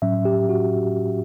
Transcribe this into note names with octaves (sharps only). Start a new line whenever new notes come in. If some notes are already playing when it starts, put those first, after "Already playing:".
A2 F#3 C#4 E5
G4
F#4